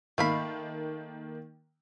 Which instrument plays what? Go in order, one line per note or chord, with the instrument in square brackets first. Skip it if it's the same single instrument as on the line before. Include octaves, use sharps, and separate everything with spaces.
[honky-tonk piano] D#3 A#3 [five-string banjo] A3 F5 B5